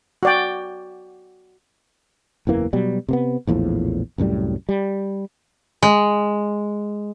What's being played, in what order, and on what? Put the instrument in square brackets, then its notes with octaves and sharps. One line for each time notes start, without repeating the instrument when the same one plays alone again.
[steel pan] F#4 D5 G5
[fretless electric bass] F#1 E2 E3 A#3
B2 F#3 G3
C3 A#3 B3
A#1 E2 A2 F3
C2 F#2 A2 G3
G3
[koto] G#3